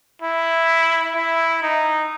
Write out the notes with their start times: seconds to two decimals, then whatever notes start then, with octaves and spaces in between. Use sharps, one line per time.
0.22 E4
1.15 E4
1.62 D#4